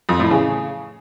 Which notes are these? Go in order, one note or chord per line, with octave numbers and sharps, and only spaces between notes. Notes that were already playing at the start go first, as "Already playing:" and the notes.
F2
A2
C#3